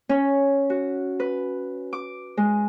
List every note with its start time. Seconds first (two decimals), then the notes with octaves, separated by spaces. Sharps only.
0.09 C#4
0.70 F#4
1.20 B4
1.93 D6
2.37 G#3